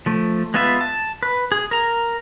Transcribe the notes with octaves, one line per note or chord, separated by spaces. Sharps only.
F3 A3
G#3 B3 F4 B4 E5
A5
B4
G#4
A#4 A#5